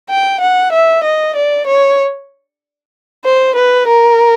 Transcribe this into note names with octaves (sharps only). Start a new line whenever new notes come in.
G5
F#5
E5
D#5
D5
C#5
C5
B4
A#4